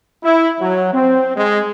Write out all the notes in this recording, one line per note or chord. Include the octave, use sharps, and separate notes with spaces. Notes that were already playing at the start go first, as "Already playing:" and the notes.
E4
F#3
C4
G#3